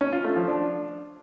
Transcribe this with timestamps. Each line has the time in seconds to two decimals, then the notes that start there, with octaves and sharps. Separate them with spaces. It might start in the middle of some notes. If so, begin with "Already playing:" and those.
0.01 C#4
0.13 F4
0.24 A3
0.36 F3
0.48 D4